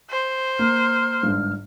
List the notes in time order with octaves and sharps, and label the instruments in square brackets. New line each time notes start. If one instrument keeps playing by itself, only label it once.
[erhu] C5
[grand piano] A#3 [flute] F6
[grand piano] G1 G#2 D4